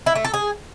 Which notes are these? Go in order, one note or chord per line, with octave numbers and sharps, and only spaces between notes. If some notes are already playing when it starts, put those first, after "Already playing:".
E4
A3
A4
G#4